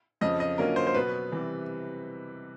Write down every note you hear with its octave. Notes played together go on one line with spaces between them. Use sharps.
F2 C#3 F3 D#5
D#5
D3 F#3 A#3 C#4 F4 A#4
C5
C5
B2 F#3 B3 B4
C3 E3 G3